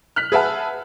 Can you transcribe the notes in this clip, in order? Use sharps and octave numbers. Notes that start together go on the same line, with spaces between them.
F6 F#6 B6
G#4 B4 E5 F#5 A5